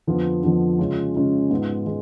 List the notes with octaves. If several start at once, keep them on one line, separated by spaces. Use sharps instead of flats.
F2 D3 F3 B3 F4
F2 D3 F3 B3 F4
C#3 G#3 C#4 F4
C#3 G#3 C#4 F4
G#2 G#3 B3 F4
G#3